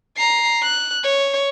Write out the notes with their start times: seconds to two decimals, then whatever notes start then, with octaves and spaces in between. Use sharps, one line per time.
0.17 A#5 C7
0.63 F#6
1.03 C#5